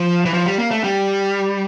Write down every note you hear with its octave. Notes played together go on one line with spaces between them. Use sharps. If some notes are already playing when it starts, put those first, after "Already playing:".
Already playing: F3
E3
F3
G3
A#3
A3
G3